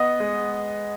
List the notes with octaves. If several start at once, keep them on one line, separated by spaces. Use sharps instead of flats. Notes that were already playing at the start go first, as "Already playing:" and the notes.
Already playing: B3 D#5
G#3